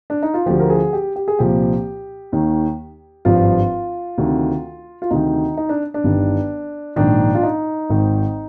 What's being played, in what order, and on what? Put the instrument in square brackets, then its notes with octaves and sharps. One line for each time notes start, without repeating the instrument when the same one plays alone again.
[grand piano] D4
D#4
F4
D2 D3 F3 G4
A#4
G#4
G4
G4
G#4
C2 A#2 F3 G4
D#2 D#3
G#1 G2 F3 F4
D2 C3 D#3
F4
D2 C3 D#3 D#4
D#4
D4
D4
G1 G2 D#3
A#1 G#2 D#3 D4
F4
D#4
G#1 G#2 D#3